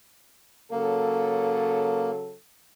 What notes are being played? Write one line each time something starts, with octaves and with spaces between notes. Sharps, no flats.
C#3 F#3 A#3 A4